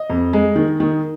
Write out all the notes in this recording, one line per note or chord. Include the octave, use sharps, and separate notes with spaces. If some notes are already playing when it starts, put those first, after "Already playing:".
Already playing: D#5
F2
G#3
D#3
D#3